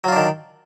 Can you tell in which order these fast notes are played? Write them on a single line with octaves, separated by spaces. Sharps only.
F#3 F4 D4 D#3